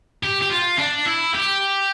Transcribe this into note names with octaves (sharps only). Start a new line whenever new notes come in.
G4
G4
F4
D4
E4
G4